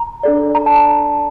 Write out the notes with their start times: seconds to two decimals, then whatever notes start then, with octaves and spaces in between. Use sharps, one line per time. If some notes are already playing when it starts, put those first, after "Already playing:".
Already playing: A#5
0.23 D4 A4 D5
0.55 A#5
0.66 A5